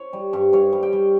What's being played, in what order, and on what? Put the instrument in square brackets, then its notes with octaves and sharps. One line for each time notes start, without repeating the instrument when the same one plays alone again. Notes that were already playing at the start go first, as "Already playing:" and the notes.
Already playing: [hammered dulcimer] C#5
G3
G2
G2 C#5
G3
G5
G3